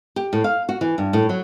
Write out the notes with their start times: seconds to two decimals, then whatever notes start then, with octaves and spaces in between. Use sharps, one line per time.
0.16 G4
0.33 A2
0.44 F5
0.69 F#4
0.81 E3
0.98 G2
1.13 A2
1.29 F#3